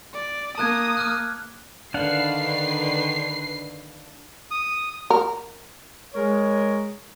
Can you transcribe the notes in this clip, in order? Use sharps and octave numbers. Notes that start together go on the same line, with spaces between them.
D5
A#3 A5 D#6 F#6 G#6
D6 F6 F#6
D3 D#3 D4 B4 F5 F#5 C7
D#6
A#4
G#3 A#4 C#5